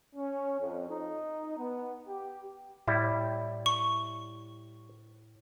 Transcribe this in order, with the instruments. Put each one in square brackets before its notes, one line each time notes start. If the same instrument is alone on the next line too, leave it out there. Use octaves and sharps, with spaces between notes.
[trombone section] C#4
F2
D#4
B3
G4
[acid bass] A2 [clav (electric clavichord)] G3 E4
[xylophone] C#6